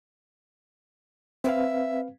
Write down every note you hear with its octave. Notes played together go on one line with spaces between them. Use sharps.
C4 B4 E5 F5